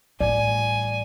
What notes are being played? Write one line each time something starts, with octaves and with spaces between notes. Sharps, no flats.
A1 G3 D5 G#5